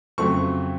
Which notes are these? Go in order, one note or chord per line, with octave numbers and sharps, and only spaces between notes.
F2 C#3 F#3 A3 C4 C#6